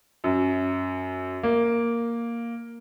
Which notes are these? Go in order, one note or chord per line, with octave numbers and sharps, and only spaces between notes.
F#2
A#3